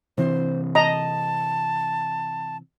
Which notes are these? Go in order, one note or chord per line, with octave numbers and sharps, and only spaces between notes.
C3 E3 C4 C5
D#5 A5 A#5